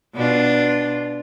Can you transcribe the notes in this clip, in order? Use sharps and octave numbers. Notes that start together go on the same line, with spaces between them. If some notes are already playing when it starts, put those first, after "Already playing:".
B2 D4 F4